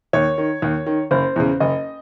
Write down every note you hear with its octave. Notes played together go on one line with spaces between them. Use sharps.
D#2 C#5
D#3
D#2
D#3
F#1 C5
E2 C#3
F#1 D#5